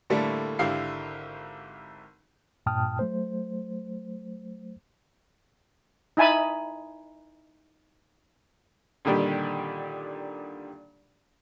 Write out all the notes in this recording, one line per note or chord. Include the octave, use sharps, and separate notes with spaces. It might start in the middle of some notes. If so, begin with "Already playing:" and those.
A2 D3 G3 A3 A#3
G#1 D3 E4 G4 F5 C7
G2 A#2 G5 A5 D#6 F6
F#3 A3 C5
D#4 E4 G#5 A5 B5
A#2 D3 D#3 G3 D4 G4